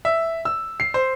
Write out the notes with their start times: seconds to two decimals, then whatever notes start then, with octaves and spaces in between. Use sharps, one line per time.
0.05 E5
0.45 E6
0.80 C7
0.94 C5